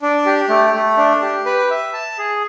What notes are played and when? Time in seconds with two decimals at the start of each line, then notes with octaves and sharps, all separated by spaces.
0.02 D4
0.26 G4
0.49 A3
0.74 A3
0.97 D4
1.22 G4
1.46 B4
1.70 E5
1.93 A5
2.19 G#4